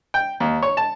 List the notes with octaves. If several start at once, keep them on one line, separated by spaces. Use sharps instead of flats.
G5
D#2
C#5
A5